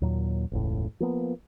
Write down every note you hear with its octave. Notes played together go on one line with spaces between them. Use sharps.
D#2 A#2 F#3
E1 C#2 A2
F3 A#3 B3